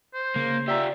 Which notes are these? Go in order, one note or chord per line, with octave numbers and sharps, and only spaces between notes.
C5
C#3 A#3
F4 G4 D5 E5 A#5